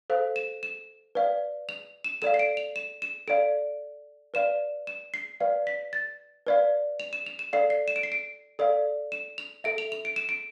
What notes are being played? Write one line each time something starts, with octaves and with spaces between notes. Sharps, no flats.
A4 C5 F5
E7
E7
B4 D5 F5
F7
E7
A4 D5 F5 E7
C7
D7
F7
E7
E7
A4 D5 F5 D7
B4 D5 F5 E7
E7
C7
B4 D5 F5
B6
A6
B4 D5 F5
F7
E7
F7
E7
A4 D5 F5 C7
C7
E7
D7
C7
D7
A4 D5 F5
E7
F7
A4 E5 D7
F7
F7
D7
E7
D7